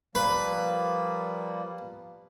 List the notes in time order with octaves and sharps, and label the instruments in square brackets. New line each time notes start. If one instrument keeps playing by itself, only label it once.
[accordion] F3 G3 A#3 [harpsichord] B4